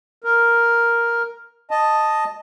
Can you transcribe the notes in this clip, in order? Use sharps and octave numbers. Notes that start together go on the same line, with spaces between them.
A#4
D#5 A5